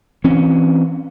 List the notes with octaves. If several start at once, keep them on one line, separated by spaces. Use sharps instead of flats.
E3 C4 C#4